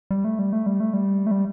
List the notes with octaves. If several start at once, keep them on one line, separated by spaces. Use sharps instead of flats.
G3
A3
G3
A3
G3
A3
G3
A3
G3